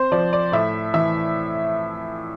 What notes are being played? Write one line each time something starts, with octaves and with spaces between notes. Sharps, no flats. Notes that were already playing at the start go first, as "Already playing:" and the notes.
Already playing: C4 C5
F3 D5
D5
A2 E5
E3 E5